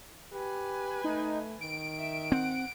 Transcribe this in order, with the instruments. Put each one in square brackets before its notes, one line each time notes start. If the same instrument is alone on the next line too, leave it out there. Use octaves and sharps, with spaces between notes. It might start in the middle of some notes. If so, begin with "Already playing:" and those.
[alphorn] G4 [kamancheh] B4 G#5
[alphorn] A3 [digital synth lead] D#4
[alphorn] D#3 [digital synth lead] D7
[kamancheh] E5
[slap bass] C4 [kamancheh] F#5